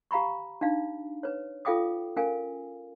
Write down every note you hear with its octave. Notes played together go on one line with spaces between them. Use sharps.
G4 F5 A#5 B5 C#6
D4 D#4 F5
B4 C#5
F4 A4 F5 G5 D6 D#6
C#4 A#4 F5 G#5